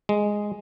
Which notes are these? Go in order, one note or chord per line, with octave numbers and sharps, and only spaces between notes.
G#3